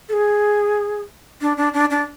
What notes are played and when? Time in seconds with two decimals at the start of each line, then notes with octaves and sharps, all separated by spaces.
0.09 A4
0.13 G#4
1.42 D4
1.57 D4
1.74 D4
1.91 D4